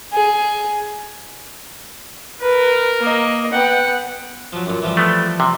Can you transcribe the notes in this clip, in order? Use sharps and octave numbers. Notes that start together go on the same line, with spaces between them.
G#4
A#4 B4
A#3 D#5
B3 F#5 G5
F3 F#3
F#2 A#2
E3 F3 G3
A3 B3
C3